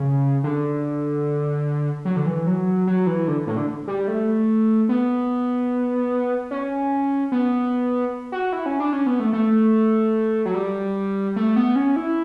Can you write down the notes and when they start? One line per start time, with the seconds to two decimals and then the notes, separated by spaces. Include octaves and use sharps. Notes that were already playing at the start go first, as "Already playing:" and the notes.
Already playing: C#3
0.44 D3
2.05 F#3
2.16 D3
2.26 E3
2.47 F#3
2.87 F#3
3.07 E3
3.28 D3
3.47 A2
3.57 D3
3.88 G3
4.08 A3
4.89 B3
6.51 C#4
7.32 B3
8.32 F#4
8.53 E4
8.66 C#4
8.80 D4
8.93 C#4
9.07 B3
9.20 A3
9.33 A3
10.45 F#3
10.54 G3
11.36 A3
11.56 B3
11.76 C#4
11.96 E4